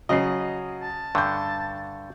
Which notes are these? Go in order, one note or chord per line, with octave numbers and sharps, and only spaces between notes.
C#3 F#3 D#5 C7
A5
G2 D3 C#6 G6